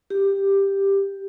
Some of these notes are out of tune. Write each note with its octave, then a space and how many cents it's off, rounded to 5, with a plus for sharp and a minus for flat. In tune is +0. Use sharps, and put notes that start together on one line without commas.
G4 +5